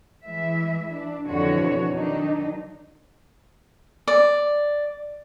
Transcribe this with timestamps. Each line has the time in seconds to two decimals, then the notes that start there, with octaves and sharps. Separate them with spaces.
0.24 E3 G#3 E5
0.93 D4
1.27 F2 B2 D3 E3 F#4 C#5
1.93 D#3 F#3 D4 D#4
4.08 D5